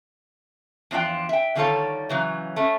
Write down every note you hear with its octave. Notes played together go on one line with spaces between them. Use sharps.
E2 F3 D4 F4 G5
E5 G5
D3 D#3 G3 F4 A4 C#5
C#3 E3 F#3
A3 C#4